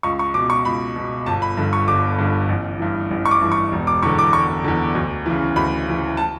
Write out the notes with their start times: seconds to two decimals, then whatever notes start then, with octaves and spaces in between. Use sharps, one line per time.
0.03 C#2 C#6
0.19 C#6
0.34 B2 D6
0.50 C#6
0.65 C#2 B5
0.96 B2
1.26 G1 A5
1.42 B5
1.57 G2 D3
1.73 C#6
1.88 G1 D6
2.18 G2 D3
2.49 A1
2.79 G2 E3
3.11 A1
3.25 C#6
3.31 D6
3.42 G2 E3
3.52 C#6
3.72 E1
3.87 D6
4.03 E2 D3 C#6
4.19 D6
4.33 E1 C#6
4.64 E2 D3
4.95 D2
5.26 C#3 E3
5.56 D2 B5
5.87 C#3 E3
6.17 A5